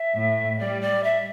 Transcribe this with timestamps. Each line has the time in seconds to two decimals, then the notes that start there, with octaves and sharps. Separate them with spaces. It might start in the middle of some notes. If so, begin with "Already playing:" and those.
Already playing: E5
0.14 A2
0.59 G3 D5
0.82 D5
1.04 E5